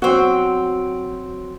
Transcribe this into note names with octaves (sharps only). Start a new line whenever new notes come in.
F#3 C4 F#4